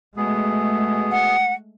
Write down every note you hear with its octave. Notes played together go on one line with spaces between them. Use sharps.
B2 G#3 A3 B3 G#4
F#5